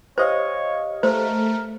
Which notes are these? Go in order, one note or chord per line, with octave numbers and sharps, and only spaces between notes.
G4 C5 C#5 D#5 F5
A3 A#4 C5